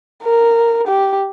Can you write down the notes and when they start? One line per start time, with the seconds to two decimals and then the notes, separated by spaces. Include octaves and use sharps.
0.23 A#4
0.88 G4